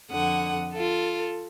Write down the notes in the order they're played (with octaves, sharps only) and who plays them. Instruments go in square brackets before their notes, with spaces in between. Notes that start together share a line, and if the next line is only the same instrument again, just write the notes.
[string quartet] F2 D3 F#5 D#6
F4 A4